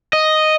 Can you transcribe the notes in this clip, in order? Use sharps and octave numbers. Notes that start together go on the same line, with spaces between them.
D#5